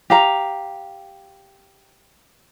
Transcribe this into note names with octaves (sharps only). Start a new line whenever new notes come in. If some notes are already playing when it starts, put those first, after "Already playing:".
G4 F5 A#5